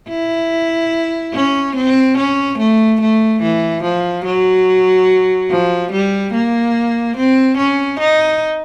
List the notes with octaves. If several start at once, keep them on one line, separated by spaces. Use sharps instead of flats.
E4
C#4
C4
C#4
A3
A3
E3
F3
F#3
F3
G3
A#3
C4
C#4
D#4